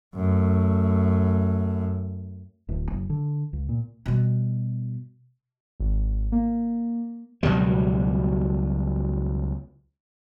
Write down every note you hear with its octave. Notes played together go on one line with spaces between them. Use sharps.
F#2 A3
D1
F#1
D3
C#2
A#2
B2 G3
G#1
A#3
C#2 B2 F#3 G3